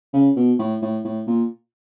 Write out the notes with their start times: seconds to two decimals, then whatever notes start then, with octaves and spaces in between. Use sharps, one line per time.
0.13 C#3
0.36 B2
0.59 A2
0.82 A2
1.05 A2
1.27 A#2